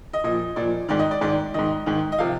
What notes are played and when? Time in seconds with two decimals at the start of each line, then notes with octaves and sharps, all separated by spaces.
0.13 D#5
0.24 A#2 F3 D#5
0.56 A#2 F3 D5
0.88 G#2 D#3 D5
0.99 D#5
1.11 D5
1.21 G#2 D#3 D5
1.54 G#2 D#3 D#5
1.86 G#2 D#3
2.12 D#5
2.19 C3 F3 F5